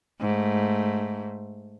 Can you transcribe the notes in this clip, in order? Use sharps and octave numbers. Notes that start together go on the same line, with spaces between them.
G#2 A3